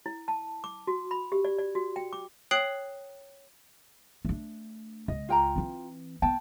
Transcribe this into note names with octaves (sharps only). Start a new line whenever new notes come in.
E4
A5
D6
F#4
B5
G4
D5
D5
F#4
G5
D6
C#5 G5 D#6 F#6 C7 F#7
A3 D4
C#2 D#5
F4 G5 A#5
E3 C4
B3 G5 A5